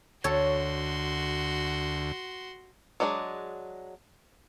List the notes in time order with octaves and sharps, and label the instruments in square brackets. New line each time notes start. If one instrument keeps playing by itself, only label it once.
[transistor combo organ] D2 [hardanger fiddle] F#4 C6 [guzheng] A4 C#5
[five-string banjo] F#3 G#3 D4 F#4 G#4